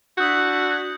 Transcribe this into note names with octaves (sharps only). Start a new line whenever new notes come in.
D4 E4 F#4 D#6 F#6 G6